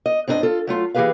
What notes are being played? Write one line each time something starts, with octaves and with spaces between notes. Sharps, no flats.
D#5
G2 C4 D4 A4 D#5
F4 A4
F#3 A3 F4
E3 A#3 G4 G#4 B4 F5